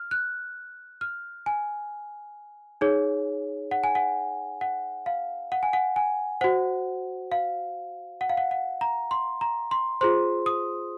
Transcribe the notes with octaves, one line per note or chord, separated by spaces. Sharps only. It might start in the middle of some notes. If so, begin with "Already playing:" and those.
Already playing: F6
F#6
F6
G#5
D#4 G#4 C#5
F#5
G#5
F#5
F#5
F5
F#5
G#5
F#5
G#5
F#4 C5 F#5
F5
F#5
F5
F#5
F#5
A#5
C6
A#5
C6
F4 G#4 C5 C6
D#6